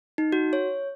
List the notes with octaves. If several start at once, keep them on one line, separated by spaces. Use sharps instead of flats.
D#4
F#4
C#5